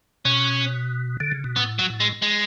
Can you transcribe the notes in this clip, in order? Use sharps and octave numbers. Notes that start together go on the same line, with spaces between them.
B2 C#4
D3
C#3
B2
A2 B3
F#3
A2
G#3
G#3